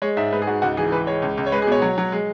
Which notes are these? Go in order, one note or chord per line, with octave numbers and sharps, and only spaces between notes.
G#3 C#5
G#2 E5
G#2 B4
G#4
G#2 F#4
C#2 F#4
E3 G#4
E3 B4
G#3 C#5
C#2
C#2
C#5
G#3 B4
G#4
B2 C#5
F#3
F#3
G#3